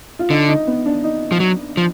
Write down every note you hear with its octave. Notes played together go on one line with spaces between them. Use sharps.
F4
D3 D#4
D#4
B3
D4
D#4
F3
F#3
F3